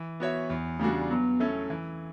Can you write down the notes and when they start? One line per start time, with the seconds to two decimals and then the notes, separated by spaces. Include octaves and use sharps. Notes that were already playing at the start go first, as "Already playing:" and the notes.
Already playing: E3
0.20 B3 F#4 C#5 E5
0.50 E2
0.79 C#3 G3 A3 D4 F#4
1.10 F#3 B3
1.40 A3 C#4 E4 A4
1.70 E3